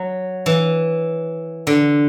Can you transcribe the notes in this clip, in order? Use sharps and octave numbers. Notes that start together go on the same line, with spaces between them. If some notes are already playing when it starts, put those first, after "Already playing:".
Already playing: F#3
E3
D3